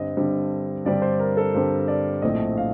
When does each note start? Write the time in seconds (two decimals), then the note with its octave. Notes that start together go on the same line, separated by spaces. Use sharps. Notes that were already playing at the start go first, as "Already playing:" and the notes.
Already playing: G2 D3 G3 C4 D#5
0.17 G2 D3 G3 C4
0.85 G2 D3 G3 C4 D5
1.02 C5
1.20 A#4
1.37 A4
1.54 G2 D3 G3 C4 C5
1.88 D5
2.22 A#1 A2 A3 C4 D#5
2.57 F5